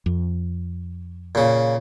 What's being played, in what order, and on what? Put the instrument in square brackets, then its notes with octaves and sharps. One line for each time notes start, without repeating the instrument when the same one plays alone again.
[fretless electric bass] F2
[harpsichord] A#2 C#3